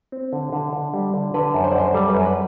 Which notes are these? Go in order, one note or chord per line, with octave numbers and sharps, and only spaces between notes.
C4
D3
D3
D3
G3
D3
D3 B4
F#2
C5
D5
F#2 C5
G3 A4
F#2 B4
B4